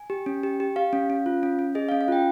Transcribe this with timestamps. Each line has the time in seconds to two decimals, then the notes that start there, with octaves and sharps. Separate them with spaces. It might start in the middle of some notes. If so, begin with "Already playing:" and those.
Already playing: G#5
0.10 G4
0.26 C#4
0.43 G4
0.60 G4
0.76 G4 F5
0.93 C#4
1.10 C#4
1.26 F4
1.43 C#4
1.59 C#4
1.75 G#4 D#5
1.89 C#4 F5
2.01 F5
2.08 F4 G5